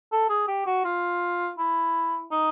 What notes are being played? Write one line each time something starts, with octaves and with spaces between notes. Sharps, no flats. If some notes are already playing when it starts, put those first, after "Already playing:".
A4
G#4
G4
F#4
F4
E4
D#4